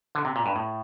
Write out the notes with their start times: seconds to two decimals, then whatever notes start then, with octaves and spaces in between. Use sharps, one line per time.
0.15 D3
0.25 C3
0.36 A#2
0.46 G2
0.56 A2